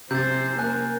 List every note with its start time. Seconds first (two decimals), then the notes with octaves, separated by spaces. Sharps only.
0.11 C3 C#4 C5 G6 A6
0.59 A#3 A#4 G#5 F#6